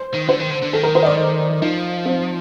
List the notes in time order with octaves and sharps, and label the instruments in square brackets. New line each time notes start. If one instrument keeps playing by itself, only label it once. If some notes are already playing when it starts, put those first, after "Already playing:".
Already playing: [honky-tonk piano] C5
[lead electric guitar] D#3
[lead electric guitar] D3 [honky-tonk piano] C5
[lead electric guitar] D#3
D3
D3
[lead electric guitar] D#3 [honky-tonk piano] A4
[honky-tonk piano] A#4
C5
D#5
D5
[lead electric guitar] F3 [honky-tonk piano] D#4
[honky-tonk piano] C4